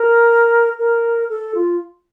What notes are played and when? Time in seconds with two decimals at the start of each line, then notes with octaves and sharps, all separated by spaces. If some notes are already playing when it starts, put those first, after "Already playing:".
Already playing: A#4
0.79 A#4
1.29 A4
1.55 F4